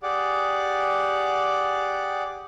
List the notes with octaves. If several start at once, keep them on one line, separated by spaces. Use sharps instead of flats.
G4 G#4 D5 F#5 D6